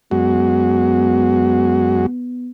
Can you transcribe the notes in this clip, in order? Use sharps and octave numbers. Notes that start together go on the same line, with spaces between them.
F#2 G#3 B3 F#4